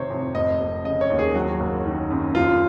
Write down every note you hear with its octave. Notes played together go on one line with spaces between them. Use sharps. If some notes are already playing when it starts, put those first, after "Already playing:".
Already playing: F1 C3 D#3 C5 C#5
F2
F1 D#5
F1
C#3 D#5
C#5
D#2
G#4
F#3 F#4
F#1
D#3
F#2
F1 F4